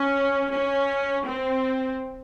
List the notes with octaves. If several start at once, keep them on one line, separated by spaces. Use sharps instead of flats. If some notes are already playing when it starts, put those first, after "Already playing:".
Already playing: C#4
C#4
C4